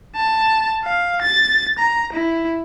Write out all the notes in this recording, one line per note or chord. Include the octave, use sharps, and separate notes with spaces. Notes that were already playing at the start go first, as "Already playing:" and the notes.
A5
F5
A6
A#5
E4